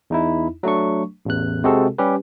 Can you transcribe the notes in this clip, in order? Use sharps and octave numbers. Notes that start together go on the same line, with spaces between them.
E2 D#4 E4
F#3 A3 D4 C#6
A1 E2 F#6
C3 G#3 C4 F#4 G#4 A4
G3 C#4 G4 B4